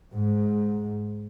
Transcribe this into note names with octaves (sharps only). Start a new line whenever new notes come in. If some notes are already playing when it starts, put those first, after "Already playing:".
G#2